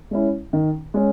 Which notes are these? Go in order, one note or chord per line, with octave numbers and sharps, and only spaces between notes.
G#3 C#4 E4
D#3
G#3 C#4